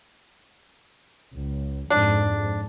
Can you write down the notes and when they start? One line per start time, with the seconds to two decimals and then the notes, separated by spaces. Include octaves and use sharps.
1.34 C#2
1.90 F2 G#2 D4